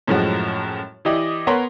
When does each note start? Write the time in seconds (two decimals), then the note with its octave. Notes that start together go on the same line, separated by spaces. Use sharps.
0.08 F#2 A2 F3 G#3 C#4 F#4
1.05 E3 E4 G4 D5 D#5
1.47 B3 A#4 C#5 C6